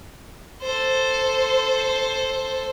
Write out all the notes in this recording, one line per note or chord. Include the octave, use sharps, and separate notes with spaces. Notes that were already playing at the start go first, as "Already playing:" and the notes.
A4 C5